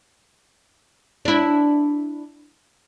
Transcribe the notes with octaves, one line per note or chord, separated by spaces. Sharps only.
D4 E4